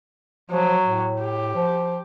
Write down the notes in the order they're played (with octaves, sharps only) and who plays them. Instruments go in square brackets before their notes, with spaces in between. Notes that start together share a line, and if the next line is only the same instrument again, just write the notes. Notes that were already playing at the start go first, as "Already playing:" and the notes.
[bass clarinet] F3 [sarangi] F#3
[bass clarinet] A2
[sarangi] G4
[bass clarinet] F3